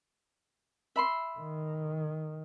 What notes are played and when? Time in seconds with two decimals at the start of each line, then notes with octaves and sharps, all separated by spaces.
0.96 E5 B5 C6
1.39 D#3